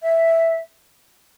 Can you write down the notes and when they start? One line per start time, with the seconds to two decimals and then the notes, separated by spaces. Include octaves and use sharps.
0.02 E5